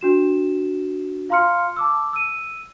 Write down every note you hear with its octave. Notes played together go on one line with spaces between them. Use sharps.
D4 F#4 E7
F4 F5 A#5 C6 F6 C#7
A5 D6 E6
E6 D#7